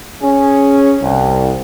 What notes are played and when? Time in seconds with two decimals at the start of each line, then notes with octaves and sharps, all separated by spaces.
0.22 C#4 G#4
1.02 C2